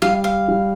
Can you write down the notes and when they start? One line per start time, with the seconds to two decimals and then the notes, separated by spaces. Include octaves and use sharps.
0.02 G3 F5
0.24 F5
0.48 G3